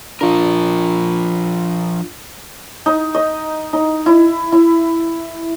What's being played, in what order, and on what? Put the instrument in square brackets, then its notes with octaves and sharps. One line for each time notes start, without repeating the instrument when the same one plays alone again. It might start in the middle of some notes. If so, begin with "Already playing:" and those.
[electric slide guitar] F3 A#4 [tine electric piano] D4 F4
[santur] D#4
D#5
D#4
E4
E4